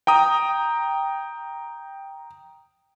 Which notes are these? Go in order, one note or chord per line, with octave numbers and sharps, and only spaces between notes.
G5 A#5 D#6